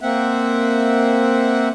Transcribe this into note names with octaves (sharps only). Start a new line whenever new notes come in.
A#3 C4 E5 F#5